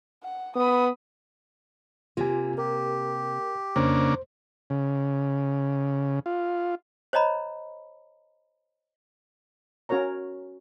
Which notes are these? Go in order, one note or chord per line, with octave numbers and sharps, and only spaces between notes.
F#5
B3 B5 D#6
C3 A#3 F4 G#5
G4 A#4
F2 C#3 A#3 D4 C5
C#3
F4
C5 C#5 D#5 A#5 B5
C#4 F#4 A#4 C#5 A#5